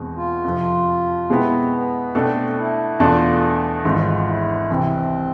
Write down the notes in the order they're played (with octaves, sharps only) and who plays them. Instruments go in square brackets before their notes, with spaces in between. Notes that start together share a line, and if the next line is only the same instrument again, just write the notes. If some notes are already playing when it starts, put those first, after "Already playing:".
Already playing: [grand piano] E2 B2 G#3 C4
[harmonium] F4
[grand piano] F2 C3 F3
[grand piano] B2 G#3 B3 E4 [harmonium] C4
[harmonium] B3
[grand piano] B2 A3 D4 A4 [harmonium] C4
[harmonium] D4
E4
[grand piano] E2 B2 A3 D4 A4 [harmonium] F4
[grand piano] G#1 G#2 E3 [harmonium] F4
[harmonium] E4
[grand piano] C2 C3 E3 [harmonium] C4